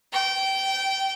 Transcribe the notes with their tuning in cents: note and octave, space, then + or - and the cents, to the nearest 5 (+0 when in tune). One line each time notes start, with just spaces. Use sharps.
G5 -20